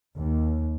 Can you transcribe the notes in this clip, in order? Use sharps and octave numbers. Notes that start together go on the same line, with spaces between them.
D#2